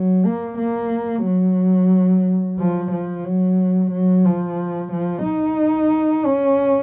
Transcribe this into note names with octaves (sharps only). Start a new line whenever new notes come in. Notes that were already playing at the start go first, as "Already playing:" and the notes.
Already playing: F#3
A#3
A#3
F#3
F3
F3
F#3
F#3
F3
F3
D#4
C#4